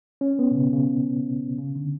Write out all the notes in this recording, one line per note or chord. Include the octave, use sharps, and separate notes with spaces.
C#4
B3
B2
C#3
C#3
C#3
D3